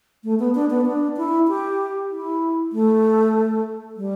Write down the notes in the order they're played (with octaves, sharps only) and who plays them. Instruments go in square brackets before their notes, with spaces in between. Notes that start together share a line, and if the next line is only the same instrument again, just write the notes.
[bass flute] A3
B3
D4
B3
D4
E4
G4
E4
A3
G3